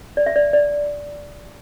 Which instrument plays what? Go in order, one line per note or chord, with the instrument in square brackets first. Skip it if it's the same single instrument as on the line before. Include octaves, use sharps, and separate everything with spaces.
[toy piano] D5
E5
D5
D5